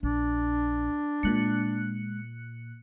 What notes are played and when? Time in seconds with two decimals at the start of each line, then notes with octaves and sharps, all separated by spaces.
0.03 A#1 D4
1.23 A#2 G#3 F#6 C#7